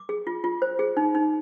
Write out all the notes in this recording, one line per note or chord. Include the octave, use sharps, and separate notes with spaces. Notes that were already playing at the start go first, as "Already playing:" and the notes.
Already playing: D6
G#4
F4
F4
C5
G#4
D#4
D#4